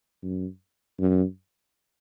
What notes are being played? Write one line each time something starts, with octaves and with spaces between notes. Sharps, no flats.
F#2
F#2